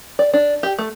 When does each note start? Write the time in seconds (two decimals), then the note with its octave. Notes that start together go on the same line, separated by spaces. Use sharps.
0.19 D5
0.33 D4
0.63 G4
0.78 A3